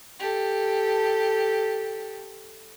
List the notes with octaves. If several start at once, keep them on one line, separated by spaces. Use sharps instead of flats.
G4 A4